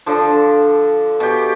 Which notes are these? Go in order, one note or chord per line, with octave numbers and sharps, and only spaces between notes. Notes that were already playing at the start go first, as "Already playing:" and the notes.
D3 F3
B2 G4